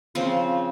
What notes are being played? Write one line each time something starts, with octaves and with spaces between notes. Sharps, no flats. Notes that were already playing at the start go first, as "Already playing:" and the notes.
C#3 F3 C4 C5